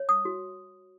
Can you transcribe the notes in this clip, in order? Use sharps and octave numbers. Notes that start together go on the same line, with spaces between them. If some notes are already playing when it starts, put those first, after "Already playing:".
Already playing: C#5
D#6
F#4